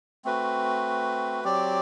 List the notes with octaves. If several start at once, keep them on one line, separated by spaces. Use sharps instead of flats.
A3 C4 F#4 B4
F#3 C4 G4 D5